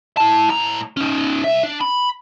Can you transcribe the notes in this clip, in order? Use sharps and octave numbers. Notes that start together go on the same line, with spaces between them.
E4 A5
A2 A#5
C#4 D#4
C2 E5
D4
B5